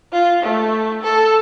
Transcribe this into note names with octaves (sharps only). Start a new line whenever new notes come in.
F4
A3
A4